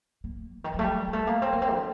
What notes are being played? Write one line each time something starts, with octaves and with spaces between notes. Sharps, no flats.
A#3
D3
D#3
F#3
A3
G3
G3
A3
A#3
C4
A#3
C4
D3